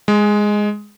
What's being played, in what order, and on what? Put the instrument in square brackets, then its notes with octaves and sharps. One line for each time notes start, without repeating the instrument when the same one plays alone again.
[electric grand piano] G#3